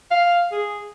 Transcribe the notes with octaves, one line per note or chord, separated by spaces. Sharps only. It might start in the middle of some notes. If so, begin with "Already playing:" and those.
F5
G#4